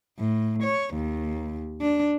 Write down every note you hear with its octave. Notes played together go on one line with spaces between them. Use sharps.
A2
C#5
D#2
D4